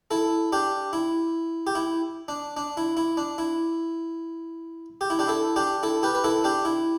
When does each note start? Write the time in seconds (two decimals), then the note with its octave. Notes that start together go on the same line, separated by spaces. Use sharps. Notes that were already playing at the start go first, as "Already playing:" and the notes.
0.11 E4 A4
0.52 D4 G4
0.93 E4
1.67 G4
1.75 E4
2.28 D4
2.57 D4
2.77 E4
2.97 E4
3.17 D4
3.38 E4
5.01 G4
5.10 E4
5.19 D4 G4
5.28 E4 A4
5.56 D4 G4
5.83 E4 A4
6.03 G4 B4
6.15 B4
6.24 E4 A4
6.44 D4 G4
6.65 E4